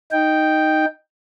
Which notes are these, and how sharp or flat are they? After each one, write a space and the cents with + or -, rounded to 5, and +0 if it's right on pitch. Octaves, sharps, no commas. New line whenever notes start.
D#4 +0 G5 +0